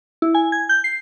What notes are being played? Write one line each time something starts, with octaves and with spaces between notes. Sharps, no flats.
E4
G#5
G#6
G6
C7